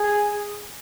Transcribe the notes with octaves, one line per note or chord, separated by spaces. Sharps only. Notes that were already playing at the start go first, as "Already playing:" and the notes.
Already playing: G#4